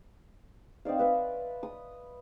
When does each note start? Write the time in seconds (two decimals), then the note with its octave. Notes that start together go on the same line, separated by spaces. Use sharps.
0.85 C4 D#4 D5 F5
0.99 B4 E5
1.63 D#6